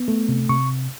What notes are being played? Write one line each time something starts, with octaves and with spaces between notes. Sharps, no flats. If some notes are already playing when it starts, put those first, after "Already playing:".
Already playing: B3
A3
C3
C3 C#6